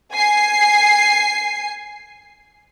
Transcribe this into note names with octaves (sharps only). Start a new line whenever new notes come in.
G#5 C7